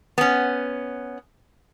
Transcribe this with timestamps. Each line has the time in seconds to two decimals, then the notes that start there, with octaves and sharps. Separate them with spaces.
0.18 B3 C#4